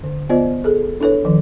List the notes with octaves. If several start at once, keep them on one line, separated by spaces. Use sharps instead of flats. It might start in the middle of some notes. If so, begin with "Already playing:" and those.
D3
B3 F4 C5 D5 D#5
G#4 A4
D4 E4 A4 B4 C#5
D#3 F3